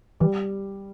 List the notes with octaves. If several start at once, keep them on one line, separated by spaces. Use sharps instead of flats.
E3 G3